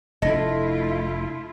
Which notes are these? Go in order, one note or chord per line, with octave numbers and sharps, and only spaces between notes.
F1 A3 D4 E4 F4 A4 D#5 A#6